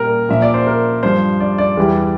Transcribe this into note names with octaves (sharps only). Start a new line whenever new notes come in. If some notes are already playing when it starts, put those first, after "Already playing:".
Already playing: A#2 G3 A#4
A#2 F3 E5
D5
C5
A#4
G2 F3 C5
D5
D5
E2 E3 G3